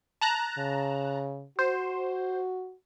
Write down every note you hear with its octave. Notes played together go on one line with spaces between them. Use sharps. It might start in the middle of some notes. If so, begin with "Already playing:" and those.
A5 A#5 F#6
C#3
F#4 C5